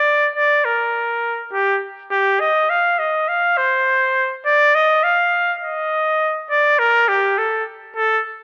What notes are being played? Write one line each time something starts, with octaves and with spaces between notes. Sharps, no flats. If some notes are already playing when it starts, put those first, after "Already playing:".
Already playing: D5
D5
A#4
G4
G4
D#5
F5
D#5
F5
C5
D5
D#5
F5
D#5
D5
A#4
G4
A4
A4